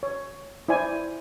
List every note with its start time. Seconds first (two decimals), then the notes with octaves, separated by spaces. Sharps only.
0.03 C#5
0.69 E4 C5 D5 G#5